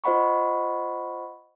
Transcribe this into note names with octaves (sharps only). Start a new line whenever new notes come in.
F4 C5 D#5 F#5 B5 C#6